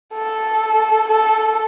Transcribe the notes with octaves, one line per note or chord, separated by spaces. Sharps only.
A4
A4